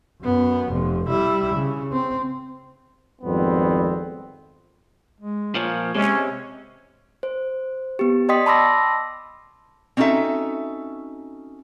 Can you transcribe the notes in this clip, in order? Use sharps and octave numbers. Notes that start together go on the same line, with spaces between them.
F#2 B3
F1 F2
G3 E4
C#3
C4
G#1 F2 G3 B3 C4
G#3
A#2 F3 C#5
C3 G#3 C#4
C5
B3 G4
D5 D#5 G5 C6 D#6 B6
A5 B5 C6 D6 E6 A#6
C4 C#4 D#4 F#4 A4 E5